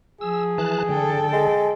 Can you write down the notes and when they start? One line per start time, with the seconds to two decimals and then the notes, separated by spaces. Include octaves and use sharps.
0.21 F3 G#4 E6
0.58 E3 A5 F#6
0.89 D3 A4 G5
1.33 G#3